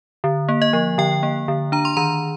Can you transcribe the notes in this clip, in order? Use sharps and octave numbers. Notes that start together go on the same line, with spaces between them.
D3
A#3
D#5
F3
D3 G5
A#3
D3
D4 A#5
C6
D#3 A#5